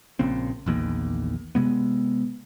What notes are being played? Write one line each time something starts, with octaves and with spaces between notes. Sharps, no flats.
A#1 A#2 C#3 C4
A#1 E2 D#3 A#3
C3 G#3 B3